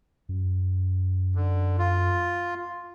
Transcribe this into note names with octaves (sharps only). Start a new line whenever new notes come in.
F#2
D3
F4